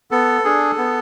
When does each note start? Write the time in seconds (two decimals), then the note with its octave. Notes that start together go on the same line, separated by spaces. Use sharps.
0.11 B3 A4
0.45 D4 G#4
0.78 B3